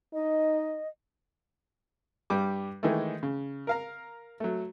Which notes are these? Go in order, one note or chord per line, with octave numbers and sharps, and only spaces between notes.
D#4 D#5
G2 G3 D6
D#3 E3 G#3 A3
C#3
A#4 F5 A#5
F#3 A3